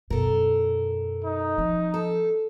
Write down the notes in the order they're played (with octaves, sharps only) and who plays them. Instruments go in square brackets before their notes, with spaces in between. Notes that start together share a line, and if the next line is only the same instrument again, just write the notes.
[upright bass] F#2 B2 [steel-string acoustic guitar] A4 A#4
[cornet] D#4
[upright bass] F3 C4
[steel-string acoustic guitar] A4